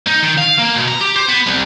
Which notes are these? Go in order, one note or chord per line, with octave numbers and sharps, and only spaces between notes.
D#4
D#3
F5
A#3
B2
A#5
G4
C5
B3
C2